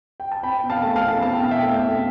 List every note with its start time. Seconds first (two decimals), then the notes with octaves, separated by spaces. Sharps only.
0.20 G5
0.31 A5
0.43 C4 G5 B5
0.63 B2
0.70 F5 A5
0.83 A3
0.96 F5 A5
1.03 B2
1.22 C4 A5
1.32 G5
1.42 B2 F5
1.51 E5 G5
1.62 A3
1.81 B2